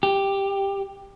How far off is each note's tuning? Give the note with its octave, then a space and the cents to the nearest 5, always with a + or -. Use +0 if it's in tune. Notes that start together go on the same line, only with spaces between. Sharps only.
G4 +5